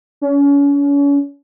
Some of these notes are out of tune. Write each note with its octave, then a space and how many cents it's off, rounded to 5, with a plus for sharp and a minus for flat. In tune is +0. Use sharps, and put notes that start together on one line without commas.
C#4 +35